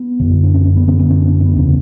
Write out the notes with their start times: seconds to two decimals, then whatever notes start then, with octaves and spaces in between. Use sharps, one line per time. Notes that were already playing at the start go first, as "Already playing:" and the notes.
Already playing: B3
0.20 F#2 D3
0.43 D4
0.54 C#4
0.65 C#4
0.77 B3
0.87 F#2 D3 C#4
0.99 B3
1.10 C#4
1.22 D4
1.41 C#4
1.45 B3
1.56 E2 C#3 C#4